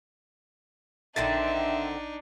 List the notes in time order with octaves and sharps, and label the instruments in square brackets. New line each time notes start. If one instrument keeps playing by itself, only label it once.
[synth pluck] A#1 A6 [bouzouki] D3 D#3 C4 [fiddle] D4 D#4 [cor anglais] E5